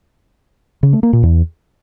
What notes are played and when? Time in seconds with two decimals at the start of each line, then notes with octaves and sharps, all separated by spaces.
0.83 C#3
0.93 A3
1.03 A#3
1.13 A#2
1.23 E2